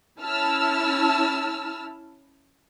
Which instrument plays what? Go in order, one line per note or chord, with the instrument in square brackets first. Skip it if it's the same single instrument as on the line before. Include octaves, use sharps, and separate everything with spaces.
[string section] C#4 E4 A5 E6 F6